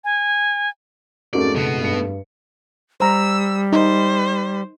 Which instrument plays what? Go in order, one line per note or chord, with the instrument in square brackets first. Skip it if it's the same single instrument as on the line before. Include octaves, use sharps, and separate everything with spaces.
[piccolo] G#5
[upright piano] F2 G#2 A3 [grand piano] C#4 F#4 A#4 [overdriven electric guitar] D5
[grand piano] F#1 [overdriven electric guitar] B2 B3
[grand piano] G2 C#7
[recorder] G3 [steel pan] C5 A#5 [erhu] E6
[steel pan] D#4 [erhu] C5